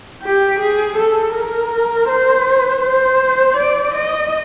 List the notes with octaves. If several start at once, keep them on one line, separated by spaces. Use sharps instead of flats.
G4
G#4
A4
A#4
C5
C5
D5
D#5